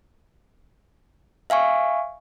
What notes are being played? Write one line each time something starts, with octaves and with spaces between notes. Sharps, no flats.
E5 F5 G#5 C#6